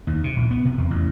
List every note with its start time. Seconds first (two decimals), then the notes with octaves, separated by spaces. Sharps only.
0.07 D#2
0.24 C3
0.37 A#1
0.51 B3
0.65 C3
0.78 E2
0.91 A1